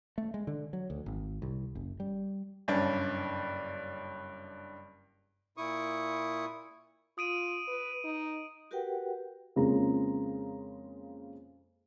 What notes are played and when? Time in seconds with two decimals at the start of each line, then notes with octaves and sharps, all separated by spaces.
0.18 A3
0.34 G#3
0.47 D3
0.73 F#3
0.90 D2
1.06 G#1
1.42 C2
1.75 F#1
2.00 G3
2.68 F#1 G2 C#4 D4
5.57 A#2 E4 C#6 D#6
7.18 F4 D#6 D7 D#7
7.68 B4
8.04 D#4
8.71 F#4 G4 A#4 B4 F#5 G5
9.56 F2 C#3 G#3 A#3 F4 A#5